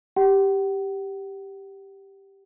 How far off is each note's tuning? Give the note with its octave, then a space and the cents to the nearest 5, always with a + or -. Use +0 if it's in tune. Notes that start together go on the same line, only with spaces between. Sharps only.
G4 +0 F#5 +40